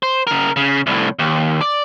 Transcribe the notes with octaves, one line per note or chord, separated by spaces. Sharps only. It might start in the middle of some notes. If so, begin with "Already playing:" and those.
C5
C#3 A#4
C#3
C2 A2
D#2
D5